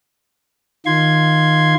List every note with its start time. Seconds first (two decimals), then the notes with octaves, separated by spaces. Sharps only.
0.86 D#3 F4 C6 G#6